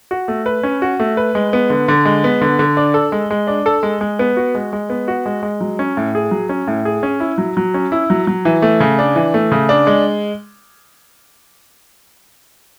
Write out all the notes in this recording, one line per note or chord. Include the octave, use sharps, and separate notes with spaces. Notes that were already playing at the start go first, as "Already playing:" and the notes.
F#4
A3
B4
C#4
F#4
A3
B4
G#3
B3
D3
D3
G#3
B3
D3
D3
D4
A4
G#3
G#3
D4
A4
G#3
G#3
B3
F#4
G#3
G#3
B3
F#4
G#3
G#3
F#3
C#4
A2
G#4
F#3
C#4
A2
G#4
C#4
E4
F#3
F#3
C#4
E4
F#3
F#3
E3
A3
C#3
D4
E3
A3
C#3
D4
G#3